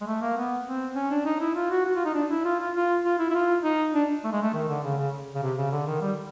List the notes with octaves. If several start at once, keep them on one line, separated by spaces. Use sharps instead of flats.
G#3
A3
A#3
B3
C4
C#4
D4
D#4
E4
F4
F#4
F#4
F4
D#4
D4
E4
F4
F4
F4
F4
E4
E4
F4
D#4
D4
A3
G#3
A3
D#3
D3
C#3
C#3
C#3
C3
C#3
D3
D#3
G3